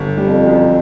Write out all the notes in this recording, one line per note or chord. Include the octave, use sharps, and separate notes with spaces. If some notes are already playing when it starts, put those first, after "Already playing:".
Already playing: G1
E2
F2 G3
F#2